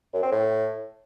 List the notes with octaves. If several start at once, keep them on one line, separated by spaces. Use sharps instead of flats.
F#2
C4
A2